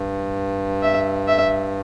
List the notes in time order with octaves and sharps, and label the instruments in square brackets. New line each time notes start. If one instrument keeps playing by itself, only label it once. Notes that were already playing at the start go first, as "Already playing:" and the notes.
Already playing: [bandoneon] G2
[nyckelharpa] E5
E5